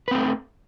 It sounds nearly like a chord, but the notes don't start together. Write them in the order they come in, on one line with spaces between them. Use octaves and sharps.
B4 C4 A3